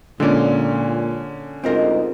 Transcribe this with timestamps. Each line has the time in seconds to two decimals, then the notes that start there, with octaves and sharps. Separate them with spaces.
0.20 A#2 D3 G#3 C#4 D5
1.64 D2 G#2 C4 F4 A#4 D#5